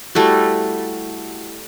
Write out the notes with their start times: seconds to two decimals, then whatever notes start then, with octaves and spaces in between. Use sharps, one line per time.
0.15 G3 A3 E4 F#4